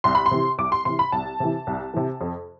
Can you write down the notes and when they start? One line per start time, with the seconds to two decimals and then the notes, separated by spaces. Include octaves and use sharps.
0.04 C2 C6
0.15 B5
0.26 C6
0.31 C3 E3
0.58 C2 D6
0.72 C6
0.85 C3 E3 C6
0.99 B5
1.12 C2 A5
1.40 C3 E3
1.67 C2
1.94 C3 E3
2.21 F2